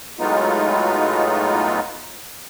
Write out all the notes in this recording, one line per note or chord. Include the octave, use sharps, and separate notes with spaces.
A2 F#3 G#3 B3 D#4 F4